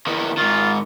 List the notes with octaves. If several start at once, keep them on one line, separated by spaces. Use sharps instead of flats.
E2 D#3
G#2 D#3 F4